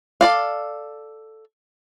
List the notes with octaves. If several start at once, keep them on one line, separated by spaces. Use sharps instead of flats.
A4 D5 F5